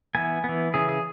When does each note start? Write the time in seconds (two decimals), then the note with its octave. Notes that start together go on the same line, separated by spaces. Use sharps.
0.15 E3 B3 G#5
0.44 E3 B3
0.74 C#3 E3 C#4 G#4
0.89 G#4